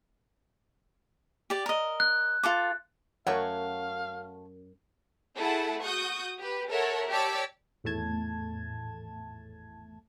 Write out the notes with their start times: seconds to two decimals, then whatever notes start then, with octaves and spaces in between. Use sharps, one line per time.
1.50 G4 D5
1.66 A#4 D#5
2.00 F#6
2.43 F4 A4 D6
3.27 F#2 A3 F#4 C#5 F5 F#5
5.36 A3 E4 G#4 A4 F#5 A5
5.82 F#4 C#6 D#6 G6
6.38 G4 B4
6.70 A4 A#4 C#5 E5 F#5
7.09 G4 C#5 D5 A5 D6 E6
7.84 G#1 E2 A2 A3 A5 G#6